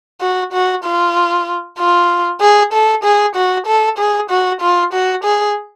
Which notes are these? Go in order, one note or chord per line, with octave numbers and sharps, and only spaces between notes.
F#4
F#4
F4
F4
G#4
A4
G#4
F#4
A4
G#4
F#4
F4
F#4
G#4